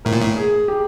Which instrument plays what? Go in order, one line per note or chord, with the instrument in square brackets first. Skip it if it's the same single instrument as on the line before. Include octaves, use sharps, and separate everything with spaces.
[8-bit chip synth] A2 [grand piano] A#4
[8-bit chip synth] A#2
A2
[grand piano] G#4
G4